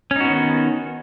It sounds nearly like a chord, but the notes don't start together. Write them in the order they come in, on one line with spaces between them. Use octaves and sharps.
C#4 D#4 F#4 B3 D#3